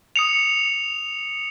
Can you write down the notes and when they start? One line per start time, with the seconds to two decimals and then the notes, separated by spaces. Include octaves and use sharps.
0.16 D#6 C#7 F7